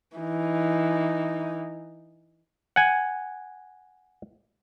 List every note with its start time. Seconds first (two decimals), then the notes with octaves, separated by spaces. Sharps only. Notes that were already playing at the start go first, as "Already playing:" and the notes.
0.17 E3 D#4
2.76 F#5 G#5